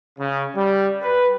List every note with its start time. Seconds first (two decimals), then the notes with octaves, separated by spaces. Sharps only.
0.19 C#3
0.55 G3
1.02 B4